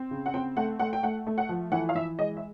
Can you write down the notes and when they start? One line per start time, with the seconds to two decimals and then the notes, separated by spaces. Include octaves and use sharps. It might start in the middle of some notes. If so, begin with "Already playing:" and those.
Already playing: C4
0.11 C#3
0.26 F#5
0.34 C4 G5
0.57 A3 F#5
0.79 A3 F#5
0.93 G5
1.03 A3 F#5
1.27 A3
1.38 F#5
1.49 F3
1.72 E3 F#5
1.89 F5
1.95 E3 E5
2.19 G#3 D#5
2.37 E5